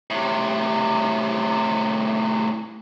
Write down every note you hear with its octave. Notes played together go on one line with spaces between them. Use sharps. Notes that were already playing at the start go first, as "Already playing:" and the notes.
A2 C3